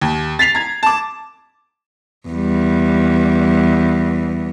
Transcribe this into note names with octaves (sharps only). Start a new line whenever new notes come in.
D#2
A6 B6 C7 F7
A#5 G#6
A5 D6
E2 G3